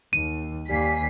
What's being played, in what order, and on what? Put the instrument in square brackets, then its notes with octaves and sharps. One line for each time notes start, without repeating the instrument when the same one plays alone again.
[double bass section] D#2 [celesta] D#7
[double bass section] D#2 [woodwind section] G3 A#3 G#5 [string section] B6 C7